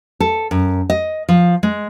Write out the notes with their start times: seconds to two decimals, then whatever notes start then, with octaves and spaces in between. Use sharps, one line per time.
0.20 A4
0.51 F#2
0.90 D#5
1.29 F3
1.63 G#3